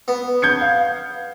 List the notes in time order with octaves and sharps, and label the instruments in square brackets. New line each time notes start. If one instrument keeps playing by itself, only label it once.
[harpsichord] B3
[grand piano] G6 G#6 C#7
F5